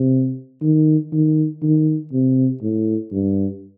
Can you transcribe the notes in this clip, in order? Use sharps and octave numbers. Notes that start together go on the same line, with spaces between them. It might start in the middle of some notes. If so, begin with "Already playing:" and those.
Already playing: C3
D#3
D#3
D#3
C3
A2
G2